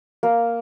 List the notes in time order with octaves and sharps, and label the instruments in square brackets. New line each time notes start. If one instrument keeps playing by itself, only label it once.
[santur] A#3